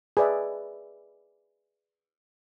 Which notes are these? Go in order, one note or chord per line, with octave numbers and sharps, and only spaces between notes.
G#4 B4 D5 E5